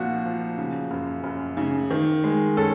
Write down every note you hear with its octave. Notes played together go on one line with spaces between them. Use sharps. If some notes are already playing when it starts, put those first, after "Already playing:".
Already playing: C2 A#2 F3 F4 F#4
F3
C#3
F#2
F#2
C#3
D#3
G#3
C#4 A4